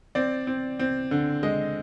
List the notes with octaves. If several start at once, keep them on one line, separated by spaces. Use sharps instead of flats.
C4 D5
C4
C4
D3
G#3 D#5